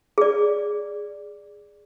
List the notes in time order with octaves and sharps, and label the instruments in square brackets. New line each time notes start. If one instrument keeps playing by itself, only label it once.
[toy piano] G#4 D5